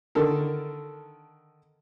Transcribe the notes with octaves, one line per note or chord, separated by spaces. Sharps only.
D3 D#3 A4 A#4